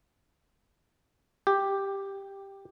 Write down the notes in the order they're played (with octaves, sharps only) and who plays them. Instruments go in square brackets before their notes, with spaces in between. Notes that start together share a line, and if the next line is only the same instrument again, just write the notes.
[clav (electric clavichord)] G4